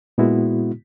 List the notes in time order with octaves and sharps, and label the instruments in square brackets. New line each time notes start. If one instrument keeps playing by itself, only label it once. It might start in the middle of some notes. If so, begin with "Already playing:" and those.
[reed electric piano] A#2 G#3 B3 E4 F#4